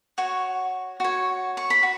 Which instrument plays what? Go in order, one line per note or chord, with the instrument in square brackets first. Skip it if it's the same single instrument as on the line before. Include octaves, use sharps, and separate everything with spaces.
[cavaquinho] F#4 C#5
F#4 C#5
C#6
B5
F#4